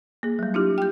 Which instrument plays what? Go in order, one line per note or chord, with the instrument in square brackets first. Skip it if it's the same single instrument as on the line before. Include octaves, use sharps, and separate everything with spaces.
[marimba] A#3 G#4
F#3 G3
D4 E4 F4 G4
G5 G6